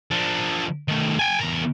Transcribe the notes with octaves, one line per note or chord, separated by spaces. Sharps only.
F3 D4
D#3 A3
G5 G#5
E2 A#4